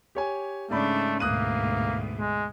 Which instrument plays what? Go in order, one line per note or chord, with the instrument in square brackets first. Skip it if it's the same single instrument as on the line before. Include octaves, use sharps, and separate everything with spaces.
[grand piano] G4 C#5 G#5
[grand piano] G#2 D5 B5 [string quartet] C#3 D4 [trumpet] A3
[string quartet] D2 G#2 B2 [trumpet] A#3 [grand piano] D#6 F#6 D#7
[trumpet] G#3